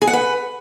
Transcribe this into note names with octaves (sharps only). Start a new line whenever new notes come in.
G#4
F#5
B4